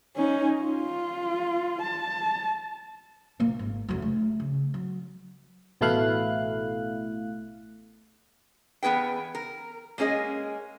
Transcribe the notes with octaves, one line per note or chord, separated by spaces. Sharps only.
C#4 D#4
F4
A5
A#2 A#3
G#1
F1 F#3
A3
C#3
F#3
A1 B2 A3 E4 F5 F#6
E2 B3 G#4 B4 G5
A#4
G#3 A#3 C#4 G#4 D#5